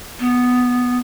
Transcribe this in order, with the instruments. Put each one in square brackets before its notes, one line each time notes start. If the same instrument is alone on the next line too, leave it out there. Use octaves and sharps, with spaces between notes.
[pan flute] B3